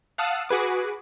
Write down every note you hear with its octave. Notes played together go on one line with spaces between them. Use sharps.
F5 F#5 A5 D#6 E6 F#6
F#4 G#4 B4 D6